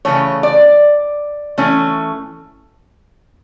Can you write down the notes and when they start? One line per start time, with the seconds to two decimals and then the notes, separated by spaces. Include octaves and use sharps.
0.05 C#3 E3 A3 C#5
0.43 D5
1.58 E3 A3 C#4